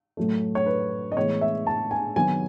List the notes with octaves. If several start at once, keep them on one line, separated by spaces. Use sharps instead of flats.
A2 F#3 A3
C#5
B4
D#5
A2 E3 G#3 B3 C#5
E5
A5
G#5
D#3 F#3 B3 G#5